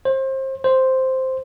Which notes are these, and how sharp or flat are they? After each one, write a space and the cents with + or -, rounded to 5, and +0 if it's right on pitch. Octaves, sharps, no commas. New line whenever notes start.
C5 +30
C5 +0